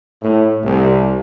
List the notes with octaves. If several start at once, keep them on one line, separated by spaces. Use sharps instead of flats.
A2
C2